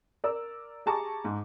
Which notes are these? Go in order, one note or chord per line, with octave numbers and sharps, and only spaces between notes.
A#4 D5 E6
G4 G#4 A5 A#5 C#6 D6
G#2